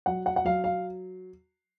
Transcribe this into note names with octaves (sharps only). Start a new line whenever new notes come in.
F#3 F#5
F#5
F#5
F#3 F5
F5